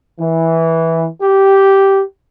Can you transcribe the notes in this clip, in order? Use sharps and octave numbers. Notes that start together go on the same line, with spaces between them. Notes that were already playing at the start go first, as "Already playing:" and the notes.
E3
G4